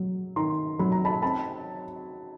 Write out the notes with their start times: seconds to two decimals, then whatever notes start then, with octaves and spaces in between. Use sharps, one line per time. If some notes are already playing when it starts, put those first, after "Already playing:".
Already playing: F#3
0.36 D#3 A#5 C6
0.79 F#3 B5
0.92 A#5
1.05 A5 B5
1.22 C4 A5 B5